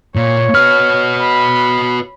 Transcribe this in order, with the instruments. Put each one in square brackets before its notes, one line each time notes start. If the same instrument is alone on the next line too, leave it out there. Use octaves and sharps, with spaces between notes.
[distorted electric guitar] A#2 [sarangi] C#5
[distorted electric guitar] F#4 B4 [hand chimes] F6
[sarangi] B5